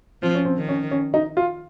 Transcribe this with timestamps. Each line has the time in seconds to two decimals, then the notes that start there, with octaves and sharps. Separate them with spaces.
0.22 F3 C4
0.35 C#4
0.45 C4
0.57 D#3
0.69 C#4
0.91 C#4
1.14 D#4
1.37 F4